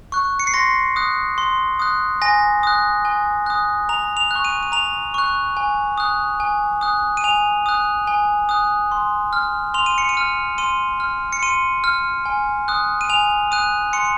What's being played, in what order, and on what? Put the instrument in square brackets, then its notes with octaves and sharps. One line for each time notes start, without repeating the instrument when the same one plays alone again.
[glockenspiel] C#6 F#6
C#7
C7
C6 A#6
D#6 F#6
C6
D#6 F#6
G#5 A#6
D#6 F#6
G#5
D#6 F#6
A#5 F7
F7
C#6 F#6
D#7
D#7
A#5 F7
C#6 F#6
G#5
D#6 F#6
G#5
D#6 F#6
D#7
G#5 F7
D#6 F#6
G#5
D#6 F#6
C6
F6
C6 F7
D#7
C#7
D#7
F6
C6 D#7
F6
C#7
C6 D#7
F6
G#5
D#6 F#6
D#7
G#5 F7
D#6 F#6 D#7
C6 C#7